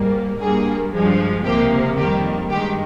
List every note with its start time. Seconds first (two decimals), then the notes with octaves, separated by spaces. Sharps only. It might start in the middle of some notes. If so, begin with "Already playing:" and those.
Already playing: G#2 G3 A#3
0.40 G2 G3 A#3 G#4
0.93 G2 F3 G#3
1.44 C#2 C3 F3 A#3 G4
1.97 F2 D#3 G3 A#3 G4
2.49 G2 D#3 G#3 G4